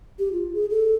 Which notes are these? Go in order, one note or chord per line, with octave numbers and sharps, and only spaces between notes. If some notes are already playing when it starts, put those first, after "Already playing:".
G4
F4
G#4
A4